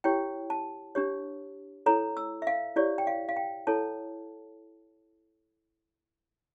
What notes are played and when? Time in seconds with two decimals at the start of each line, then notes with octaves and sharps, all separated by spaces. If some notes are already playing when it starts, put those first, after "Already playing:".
0.04 E4 G4 C#5 G5
0.50 A5
0.95 D4 G4 C#5
1.86 E4 A4 C#5 A#5
2.17 E6
2.42 E5
2.47 F5
2.76 E4 G4 C#5 D5
2.98 G5
3.07 F5
3.29 F5
3.37 G5
3.67 E4 A4 C#5 A5